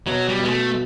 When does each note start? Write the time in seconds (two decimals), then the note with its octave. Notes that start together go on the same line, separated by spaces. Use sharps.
0.07 B2 F#3
0.29 G3
0.39 B2
0.45 G#3
0.50 A3